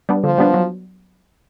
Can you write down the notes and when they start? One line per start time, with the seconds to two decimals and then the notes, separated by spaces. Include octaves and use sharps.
0.09 G3 B3 D4
0.24 D3 F3
0.38 G3 B3 D4
0.54 F#3